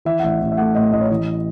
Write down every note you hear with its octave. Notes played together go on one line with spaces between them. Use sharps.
E3 E5
F#5
A1 E5
A1
E5
A3 F#5
A2 D#5
A1 D#5
C#5
E3 D#5